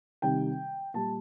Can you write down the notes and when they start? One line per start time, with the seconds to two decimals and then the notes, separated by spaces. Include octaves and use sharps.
0.22 C3 D#3 G3 G5
0.94 A#2 G3 A5